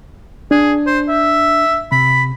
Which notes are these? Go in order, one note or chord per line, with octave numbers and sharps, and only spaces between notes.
D4 G#4
C5
E5
C3 B5